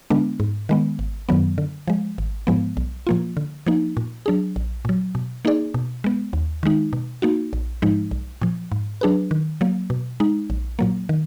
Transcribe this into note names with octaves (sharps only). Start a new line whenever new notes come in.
D3 G#3 B3 D4
G#2
D#3 G#3 B3
G#1
F#2 D#3 F#3 B3
D3
F3 G#3
G#1
G#2 F3 G#3 B3
B1
A#2 F3 A#3 F4
D3
F3 A#3 D#4
A#2
F#3 D4 G#4
A#1
A#2 F#3
B2
A#3 D#4 G#4 D5
B2
G#3 B3
D#2
D#3 G#3 D#4
B2
A#3 D#4 F#4
A#1
G#2 F3 G#3 D#4
B1
A#2 F3
G#2
F#3 D4 G#4 B4
D#3
F#3 A#3
B2
G#3 D#4
A#1
A#2 F#3 A#3
D#3